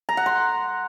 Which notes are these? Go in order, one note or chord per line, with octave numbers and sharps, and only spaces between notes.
A#5
F#5
C6